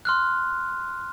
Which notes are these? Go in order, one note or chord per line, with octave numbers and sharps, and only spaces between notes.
C6 F6 F#6